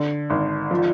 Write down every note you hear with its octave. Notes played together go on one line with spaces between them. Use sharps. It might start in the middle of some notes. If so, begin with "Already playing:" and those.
Already playing: D3
G#1
F3